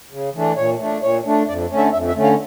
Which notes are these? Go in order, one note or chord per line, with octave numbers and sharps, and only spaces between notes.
C#3
E3 A3 D4
A#2 C#5
A3 D4
A#2 C#5
A3 D4
F2 D5
D3 A3 C#4
E5
F2 E5
E5
D3 A3 C#4
F5